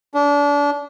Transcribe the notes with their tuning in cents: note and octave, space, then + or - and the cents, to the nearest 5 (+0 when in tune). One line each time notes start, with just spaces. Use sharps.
D4 -30